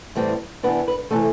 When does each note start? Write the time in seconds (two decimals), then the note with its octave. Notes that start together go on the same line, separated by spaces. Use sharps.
0.15 A2 E3 G3 C4
0.63 C3 E3 B3 D4 B4
0.88 B4
1.10 C3 E3 A3 A4